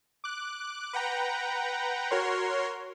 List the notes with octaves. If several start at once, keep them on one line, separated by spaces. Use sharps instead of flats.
D6 F#6
B4 F#5 G5 A#5
F#4 A#4 C#5 C6